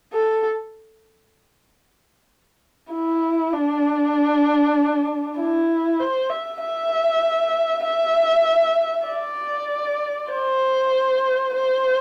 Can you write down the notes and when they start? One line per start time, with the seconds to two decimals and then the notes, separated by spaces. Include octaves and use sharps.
0.13 A4
2.92 E4
3.53 D4
5.37 E4
5.99 C5
6.30 E5
6.61 E5
7.84 E5
9.07 D5
10.31 C5
11.55 C5